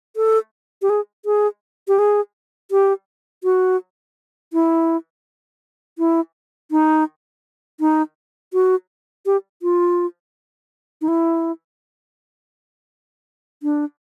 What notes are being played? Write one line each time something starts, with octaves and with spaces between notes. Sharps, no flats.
A4
G4
G#4
G#4
G4
G#4
G4
F#4
E4
E4
D#4
D#4
F#4
G4
F4
D#4
E4
D4